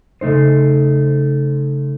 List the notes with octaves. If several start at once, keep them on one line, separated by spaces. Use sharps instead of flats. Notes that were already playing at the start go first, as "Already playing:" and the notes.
C#3 A3 D#4 C5